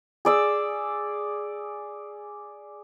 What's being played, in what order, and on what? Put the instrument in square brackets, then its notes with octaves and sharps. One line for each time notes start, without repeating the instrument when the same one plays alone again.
[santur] G#4 D5 E6